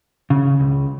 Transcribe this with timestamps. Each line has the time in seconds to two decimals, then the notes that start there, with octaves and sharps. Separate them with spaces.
0.30 C#3
0.60 C#2